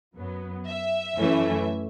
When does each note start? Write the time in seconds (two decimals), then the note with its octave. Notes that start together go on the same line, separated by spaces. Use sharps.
0.16 F#2 F#3 B3
0.66 E5
1.16 F#2 E3 A3 C#4